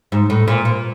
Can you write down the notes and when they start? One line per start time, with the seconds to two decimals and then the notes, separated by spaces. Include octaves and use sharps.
0.12 G#2
0.30 A2
0.48 A#2
0.65 A#2